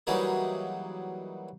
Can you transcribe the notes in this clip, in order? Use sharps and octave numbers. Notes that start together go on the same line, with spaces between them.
E3 F#3 G3 A#3 D#4 G#4